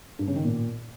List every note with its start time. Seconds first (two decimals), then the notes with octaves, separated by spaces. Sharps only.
0.19 G2
0.27 C#3
0.36 D#3
0.44 A#2